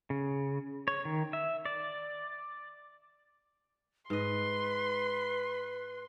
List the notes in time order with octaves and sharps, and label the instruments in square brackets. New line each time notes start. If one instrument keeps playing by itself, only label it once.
[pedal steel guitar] C#3
C#5
D#3
E5
D5
[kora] G#2 D#5 [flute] B4 [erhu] C6